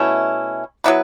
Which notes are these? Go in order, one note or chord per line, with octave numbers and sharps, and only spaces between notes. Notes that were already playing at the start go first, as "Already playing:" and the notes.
Already playing: B2 A3 C#4 E4
F#3 B3 E4 B4